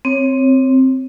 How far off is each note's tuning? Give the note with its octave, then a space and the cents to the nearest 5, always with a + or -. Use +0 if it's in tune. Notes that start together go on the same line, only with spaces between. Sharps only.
C4 +0 C#5 -15